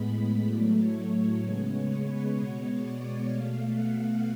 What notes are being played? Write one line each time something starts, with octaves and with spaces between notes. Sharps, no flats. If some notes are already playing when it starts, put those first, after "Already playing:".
Already playing: A2 G#3 B3 B5
B5
A2 F#3 A3 D5
C#5
C#3 G#3 B3 C#5
C#5
B4
B2 G#3 B3 C#5
D5
B2 A3 F5
F#5